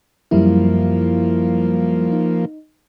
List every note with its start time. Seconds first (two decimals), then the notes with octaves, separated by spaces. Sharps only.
0.31 F#2 F3 G3 A#3 E4
2.12 D#4